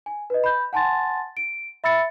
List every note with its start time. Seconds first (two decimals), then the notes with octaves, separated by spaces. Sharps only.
0.06 G#5
0.30 B4 D#5
0.44 B5 G6
0.73 F#5 G#5 A5 C6 A6
1.37 D7
1.84 E5 B5 E6 A6 C#7